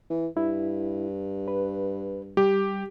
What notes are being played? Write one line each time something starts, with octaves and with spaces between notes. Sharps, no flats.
E3
G2 E4
B4
G3 G4